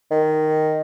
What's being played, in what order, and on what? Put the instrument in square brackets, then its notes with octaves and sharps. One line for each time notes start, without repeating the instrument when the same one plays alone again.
[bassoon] D#3